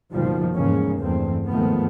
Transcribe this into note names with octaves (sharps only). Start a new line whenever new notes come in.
F#1 B2 D#3 F3 G3
E2 G#2 C#3 G#3 A#3 C#4
E2 G2 A3 C4
D#2 G#2 D#3 F3 A3 B3